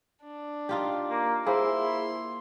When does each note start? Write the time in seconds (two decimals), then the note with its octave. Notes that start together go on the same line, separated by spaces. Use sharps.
0.22 D4
0.69 D#4 F4 G4
1.10 A#3
1.47 A#3 E4 G#4 C5 C6